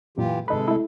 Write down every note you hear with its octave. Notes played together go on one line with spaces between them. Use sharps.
F#2 A#2 E3 F4 G4
G#1 C3 G#3 D#4 A4 B4
A3 E4